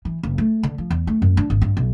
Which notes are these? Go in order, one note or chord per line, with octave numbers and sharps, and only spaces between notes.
E3
F#1
A3
D3
F3
E2
A3
F#2
D4
G#1
G2
B1